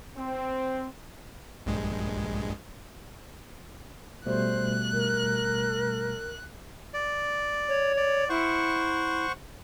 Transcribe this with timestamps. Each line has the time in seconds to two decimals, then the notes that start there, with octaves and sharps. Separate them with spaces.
0.17 C4
1.66 A#1 G2 G#3
4.26 B2 G3 A3 C5 F#6
4.93 A#4
6.94 D5
7.68 C#5
7.97 D5
8.29 E4 C5 F#5 C#6